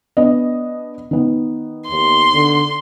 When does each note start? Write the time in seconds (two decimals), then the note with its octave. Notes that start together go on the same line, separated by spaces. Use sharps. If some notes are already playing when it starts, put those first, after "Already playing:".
0.17 B3 D4 D#5
1.11 D#3 B3
1.90 D#2 C6
2.33 D3